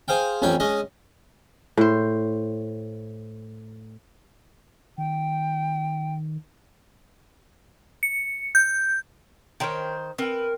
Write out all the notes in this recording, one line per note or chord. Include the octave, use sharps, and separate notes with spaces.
G#4 C5 F5 G5
A1 F2 C#4 C#5 G5
G#3 C#4 D#5
A2 C5
D#3 G5
C#7
G6
D#3 A#4 C5 C#5 G5
C4 A#4 B4 G5